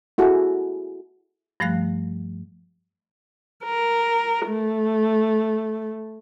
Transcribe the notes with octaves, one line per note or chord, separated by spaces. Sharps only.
E4 F#4 G#4 A4
G2 F3 G3 A3 F5 F#6
A#4
A3